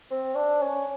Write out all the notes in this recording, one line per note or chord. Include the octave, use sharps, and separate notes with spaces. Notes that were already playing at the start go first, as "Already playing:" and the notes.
C4
D4
C#4